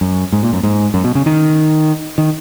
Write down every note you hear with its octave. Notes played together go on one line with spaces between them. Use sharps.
F#2
G#2
A#2
F#2
G#2
F#2
B2
C#3
D#3
D#3